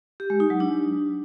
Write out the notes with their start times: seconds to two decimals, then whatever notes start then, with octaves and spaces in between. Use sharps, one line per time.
0.20 G4
0.30 G#3
0.40 D#4
0.50 F#3
0.60 D4